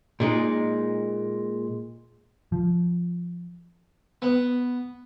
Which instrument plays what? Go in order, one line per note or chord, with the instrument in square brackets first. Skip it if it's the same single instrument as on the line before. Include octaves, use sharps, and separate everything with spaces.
[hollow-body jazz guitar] A#2 G#3 D#4
[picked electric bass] F3
[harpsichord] B3